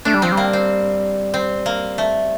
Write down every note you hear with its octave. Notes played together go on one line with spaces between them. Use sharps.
A3 D4
G3
F3 C4
G3
A#3
C4
C4
A#3
A3